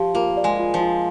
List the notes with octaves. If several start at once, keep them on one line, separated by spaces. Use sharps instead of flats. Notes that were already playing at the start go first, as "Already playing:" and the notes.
Already playing: F3 G4
A#3 F4
D5
G#3
F4
F3
F4